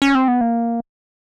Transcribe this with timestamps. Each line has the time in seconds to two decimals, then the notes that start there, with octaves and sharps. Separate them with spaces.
0.02 C#4
0.15 C4
0.28 B3
0.41 A#3